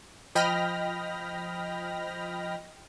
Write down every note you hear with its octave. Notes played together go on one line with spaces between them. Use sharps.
F3 D#5 G5 B5 F6 A#6